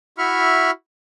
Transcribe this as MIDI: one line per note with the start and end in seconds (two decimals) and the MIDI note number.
0.18 0.71 64
0.18 0.71 66
0.18 0.71 76
0.18 0.71 83
0.18 0.71 85
0.18 0.71 89